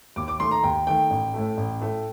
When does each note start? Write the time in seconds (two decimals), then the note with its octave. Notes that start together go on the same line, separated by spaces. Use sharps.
0.16 D#2 D6
0.28 D6
0.39 D#3 A3 C6
0.51 A#5
0.64 D#2 G5
0.87 D#3 A3 G5
1.10 A1
1.34 A2 A3
1.57 A1
1.80 A2 A3